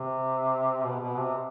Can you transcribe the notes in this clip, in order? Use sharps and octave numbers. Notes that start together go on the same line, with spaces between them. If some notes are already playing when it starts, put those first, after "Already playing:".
Already playing: C3
B2
B2
C3